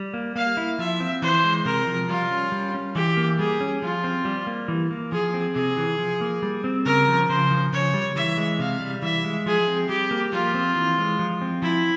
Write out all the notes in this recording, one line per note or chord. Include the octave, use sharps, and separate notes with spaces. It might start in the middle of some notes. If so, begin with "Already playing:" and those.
Already playing: G3
A#3
A#3 F5
E4
F3 E5
C4
E3 C5
G#3
C3 A#4
F3
G3 F4
C#4
G3
C#4
E3 G4
A#3
G3 G#4
C#4
F3 F4
C4
G3
A#3
E3
A#3
F3 G#4
C4
C3 G#4
E3
F3
A#3
G3
C4
C#3 A#4
F3
C#3 C5
F3
C#3 C#5
G3
E3 E5
G#3
C3 F5
G3
E3 E5
G#3
F3 G#4
C4
G3 G4
A#3
F3 F4
C4
E3
G#3
F3
C4
F3 E4